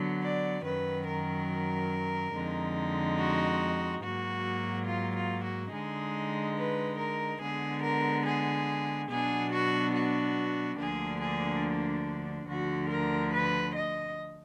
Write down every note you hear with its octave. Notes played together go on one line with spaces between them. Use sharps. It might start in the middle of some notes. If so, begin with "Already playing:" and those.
Already playing: D3 F#3 B3
D5
F#2 D#3 F#3 B4
A#4
F2 D3 G#3 D#4
F#4
G#2 F#3 A#3 F#4
F4
F4
F#4
D3 G#3 D#4 G#4
B4
A#4
D3 G#3 B3 G#4
A#4
G#4
B2 F#3 B3 D4 G#4
F#4
F#4
D2 D3 F3 A#3 D4 G#4
G#4
D2 D3 F3 F#4
A#4
B4
D#5